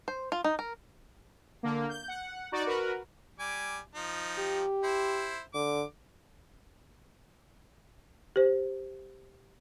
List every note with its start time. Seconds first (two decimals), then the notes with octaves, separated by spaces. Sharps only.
0.08 C5
0.32 F4
0.44 D#4
0.59 A#4
1.63 D3 A#3
1.89 G6
2.08 F#5
2.52 D#4 F#4 D5
2.66 F#4 A#4 B4
3.39 G3 G#5 D6
3.95 F3 D#4
4.39 G4
4.83 E4 C5
5.54 D3 D6
8.36 G4 C5